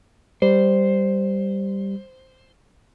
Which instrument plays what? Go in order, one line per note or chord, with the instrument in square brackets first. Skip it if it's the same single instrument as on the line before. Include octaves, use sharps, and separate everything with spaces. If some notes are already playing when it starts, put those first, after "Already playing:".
[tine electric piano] G3 [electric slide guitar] C5